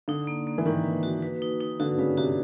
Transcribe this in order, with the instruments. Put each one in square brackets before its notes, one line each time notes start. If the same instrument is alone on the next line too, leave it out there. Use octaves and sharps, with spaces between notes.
[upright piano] D3 [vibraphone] D#4
[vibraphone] A#3
A#3
[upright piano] E3
[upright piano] D#3 [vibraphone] B4
[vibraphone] B4
F#4
B4
D#4
D#4
[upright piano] D3 [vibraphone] F#4
[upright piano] C#3 [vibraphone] B4
[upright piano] C3 [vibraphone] F#4